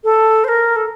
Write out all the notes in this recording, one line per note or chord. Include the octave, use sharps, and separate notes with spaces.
A4
C5
A#4
A4